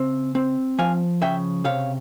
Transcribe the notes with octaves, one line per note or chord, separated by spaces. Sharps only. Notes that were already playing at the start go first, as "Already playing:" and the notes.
Already playing: C#3 C4
C4
F3 F5 G#5
C#3 E5 G5
C3 C#5 F5